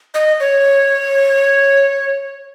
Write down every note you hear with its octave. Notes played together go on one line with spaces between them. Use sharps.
D#5
C#5